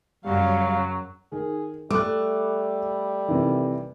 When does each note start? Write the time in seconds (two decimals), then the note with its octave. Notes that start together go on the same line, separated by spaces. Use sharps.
0.25 F#2 C#3 F#3 G3 F5
1.32 D#3 G#4
1.90 G3 A3 D6 F#6
3.28 C3 D#3 E3